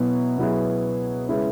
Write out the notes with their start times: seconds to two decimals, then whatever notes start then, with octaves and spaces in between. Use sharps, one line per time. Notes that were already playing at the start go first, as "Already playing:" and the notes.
Already playing: B2 F#3 B3 E4
0.38 B2 F#3 B3 E4 G#4
1.28 C#3 G#3 C#4 E4 B4